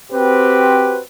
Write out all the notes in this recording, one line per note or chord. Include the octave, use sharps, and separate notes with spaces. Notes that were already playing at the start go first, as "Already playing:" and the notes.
C4 F#4 G4 B4 C5